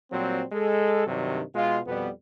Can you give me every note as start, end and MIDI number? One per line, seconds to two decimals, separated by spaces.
0.11 0.43 46
0.11 0.43 54
0.11 0.43 55
0.11 0.43 60
0.52 1.05 56
0.52 1.05 69
1.06 1.41 43
1.06 1.41 48
1.06 1.41 51
1.06 1.41 54
1.06 1.41 62
1.55 1.79 47
1.55 1.79 56
1.55 1.79 65
1.86 2.09 41
1.86 2.09 47
1.86 2.09 55
1.86 2.09 59